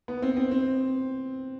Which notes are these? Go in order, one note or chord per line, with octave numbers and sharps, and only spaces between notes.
B3
C4
C4
C4